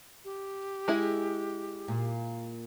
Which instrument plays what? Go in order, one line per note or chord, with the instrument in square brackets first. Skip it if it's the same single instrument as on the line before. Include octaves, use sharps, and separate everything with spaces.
[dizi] G4
[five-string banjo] G#3 E4 G#4
[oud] A#2